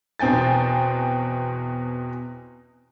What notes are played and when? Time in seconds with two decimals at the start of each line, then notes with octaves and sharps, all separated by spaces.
0.19 E2 B2 C4 G5 G#5 A6